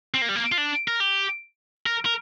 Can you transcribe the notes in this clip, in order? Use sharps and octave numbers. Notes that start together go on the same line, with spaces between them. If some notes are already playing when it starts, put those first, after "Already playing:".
C4
A#3
G3
A#3
F4
D4
A#4
G4
A#4
A#4